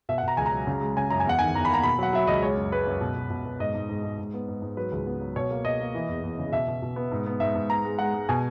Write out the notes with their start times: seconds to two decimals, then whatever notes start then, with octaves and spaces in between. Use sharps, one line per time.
0.09 B2 E5
0.18 F#5
0.23 B2 A#5
0.37 C#2 G#5
0.46 A#5
0.52 F#3
0.67 C#3
0.81 G#3
0.97 C#3 G#5
1.10 F#2 A#5
1.20 G#5
1.26 E2 F#5
1.39 D#3 G#5
1.55 E2 A#5
1.65 B5
1.70 A#3 A#5
1.83 B2 B5
1.99 F#3 F#5
2.13 F#3 E5
2.27 C#2 D#5
2.43 G#3 C#5
2.57 F#2
2.72 G#3 B4
2.87 F#2
3.01 B2
3.15 B2
3.30 B2
3.45 B2
3.60 G#2 D#5
3.75 G#2
3.89 G#2
4.04 G#2
4.19 G#2
4.34 B3
4.48 G#2
4.62 G#2
4.77 F#3 B4
4.92 C#2
5.06 B3
5.21 F#3
5.36 B2 C#5
5.51 A#3
5.65 B2 D#5
5.80 A#3
5.94 E3
6.08 E2
6.24 E2
6.39 C#3
6.52 B2 E5
6.68 B2
6.82 B2
6.96 B3
7.12 G#2
7.27 B3
7.40 G#2 E5
7.55 G#2
7.70 B3 A#5
7.85 G#3
7.99 G#3 F#5
8.14 G#3
8.29 B2 G#5